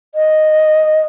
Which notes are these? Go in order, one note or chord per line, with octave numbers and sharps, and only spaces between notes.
D#5